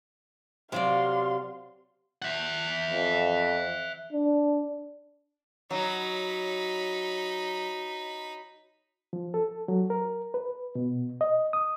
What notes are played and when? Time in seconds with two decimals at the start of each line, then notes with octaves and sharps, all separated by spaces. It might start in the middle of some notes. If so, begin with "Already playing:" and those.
0.72 C3 F#3 D5 F5 C6
2.22 E5 F#5
2.88 F2
4.13 D4
5.71 F#3 D#4 B5
9.13 F3
9.34 A4
9.68 F#3
9.90 A#4
10.34 B4
10.75 B2
11.21 D#5
11.53 D#6